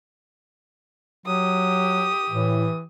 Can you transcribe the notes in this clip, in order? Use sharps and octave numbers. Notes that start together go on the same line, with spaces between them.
F#3 G4 D#6
A2 E3